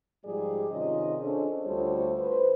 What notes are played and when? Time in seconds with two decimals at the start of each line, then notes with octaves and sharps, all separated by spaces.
0.25 G#2 F3 G3 G4 G#4 D5
0.70 C3 D#3 C#4 F4 D#5
1.19 C#4 D4 G#4 A4 C5 C#5
1.64 D2 G3 F4 A4 C5 C#5
2.19 B4 C5